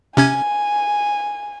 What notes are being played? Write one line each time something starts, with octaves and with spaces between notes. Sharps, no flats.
C3 C#4 G#5 G#6